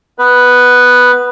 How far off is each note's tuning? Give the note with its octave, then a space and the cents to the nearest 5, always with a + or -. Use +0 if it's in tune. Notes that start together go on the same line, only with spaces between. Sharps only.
B3 +0 B4 +0